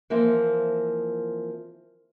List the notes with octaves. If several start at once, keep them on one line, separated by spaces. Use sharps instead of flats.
E3 F3 A#3 C4